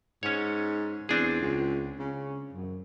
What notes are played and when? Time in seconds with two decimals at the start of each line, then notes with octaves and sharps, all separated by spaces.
0.23 G#2 C#4 C#5
1.09 E2 C4 D4 G#4
1.41 C#2
1.99 C#3
2.53 F#2